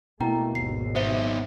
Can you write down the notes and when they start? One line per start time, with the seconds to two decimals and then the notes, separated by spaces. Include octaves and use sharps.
0.20 B2 A3 A#3 E4 G5 A#5
0.55 G#1 D#2 C7
0.95 B3 D#4 C5 E5 G7